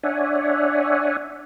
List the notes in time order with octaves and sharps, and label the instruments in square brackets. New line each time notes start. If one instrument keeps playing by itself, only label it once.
[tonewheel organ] D4 C#5 D5 E5 F#5 G#5